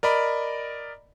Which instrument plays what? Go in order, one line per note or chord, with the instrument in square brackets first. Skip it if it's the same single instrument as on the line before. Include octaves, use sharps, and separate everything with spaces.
[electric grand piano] A#4 D5 D#5 B5